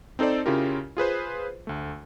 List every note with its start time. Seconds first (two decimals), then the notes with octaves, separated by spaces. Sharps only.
0.19 C4 D#4 A4 C5 D5
0.46 C#3 C#4 E4 F4 G4 A#4
0.97 F4 G#4 B4 C5
1.67 D2 A3